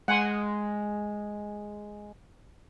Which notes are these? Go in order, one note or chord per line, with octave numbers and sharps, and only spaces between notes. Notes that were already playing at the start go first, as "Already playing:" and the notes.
G#3 F#5 G#5 C6